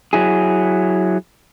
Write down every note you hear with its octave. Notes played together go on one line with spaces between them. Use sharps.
F#3 E4 G#4